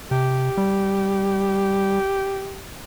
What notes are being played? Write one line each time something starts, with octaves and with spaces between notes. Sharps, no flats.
C3 G4
G3